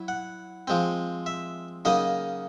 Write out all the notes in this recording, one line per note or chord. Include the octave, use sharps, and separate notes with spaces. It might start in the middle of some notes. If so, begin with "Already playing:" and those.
Already playing: F#3 E4
F#5
F3 G#3 C4
E5
C#3 F#3 A#3 D#4 D#5